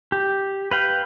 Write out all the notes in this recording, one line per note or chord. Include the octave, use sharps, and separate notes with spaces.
G4
B4 F5 G5